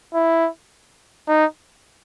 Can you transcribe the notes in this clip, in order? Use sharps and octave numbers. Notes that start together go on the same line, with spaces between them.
E4
D#4